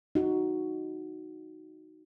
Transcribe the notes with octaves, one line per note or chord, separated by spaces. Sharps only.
D#4 F#4